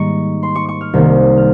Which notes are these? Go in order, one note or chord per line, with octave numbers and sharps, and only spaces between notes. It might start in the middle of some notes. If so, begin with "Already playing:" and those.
Already playing: G#2 D#3 G3 A#3 D#5 A#5 C#6
C6
C#6
C#6
F6
C2 C3 D#3 A#3
F6